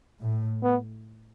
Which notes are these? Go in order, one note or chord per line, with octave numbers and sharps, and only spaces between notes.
A2
B3